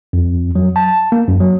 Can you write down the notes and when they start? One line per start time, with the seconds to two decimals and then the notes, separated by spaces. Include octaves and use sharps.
0.13 F2
0.55 F#3
0.76 A5
1.12 A#3
1.28 F#2
1.40 F#3